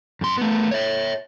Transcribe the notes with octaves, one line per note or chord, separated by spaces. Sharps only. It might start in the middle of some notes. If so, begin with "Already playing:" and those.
F#2 C6
A3 B3
C#5 E5